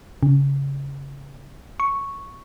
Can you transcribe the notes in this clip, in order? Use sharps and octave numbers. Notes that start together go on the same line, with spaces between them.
C#3
C#6